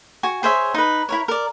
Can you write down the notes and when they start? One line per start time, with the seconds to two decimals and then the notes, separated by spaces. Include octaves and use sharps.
0.23 F#4 G#5 C#6
0.43 G#4 C5 C#5 E5
0.74 D#4 B4
1.09 E4 A#4 C#5
1.28 A#4 D5